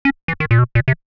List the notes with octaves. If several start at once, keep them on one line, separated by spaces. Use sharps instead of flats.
C#4
E3
D#3
A#2
B2
A#2
C3